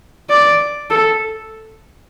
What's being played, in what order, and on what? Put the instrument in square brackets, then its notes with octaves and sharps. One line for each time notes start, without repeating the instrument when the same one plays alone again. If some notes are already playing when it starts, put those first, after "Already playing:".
[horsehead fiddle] D5
A4